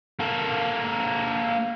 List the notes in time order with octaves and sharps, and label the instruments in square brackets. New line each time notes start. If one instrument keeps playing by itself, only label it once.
[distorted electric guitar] A#3 A4